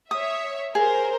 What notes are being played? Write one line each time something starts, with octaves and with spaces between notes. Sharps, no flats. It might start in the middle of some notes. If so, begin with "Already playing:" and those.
C#5 E5 D#6
G#4 A#4 C5